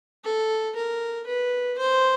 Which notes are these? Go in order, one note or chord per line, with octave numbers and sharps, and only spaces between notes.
A4
A#4
B4
C5